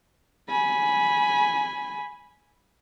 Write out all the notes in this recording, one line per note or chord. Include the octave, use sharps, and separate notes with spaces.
G#5 B5